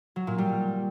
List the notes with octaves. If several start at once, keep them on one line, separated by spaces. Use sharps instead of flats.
F#3
A#2
G3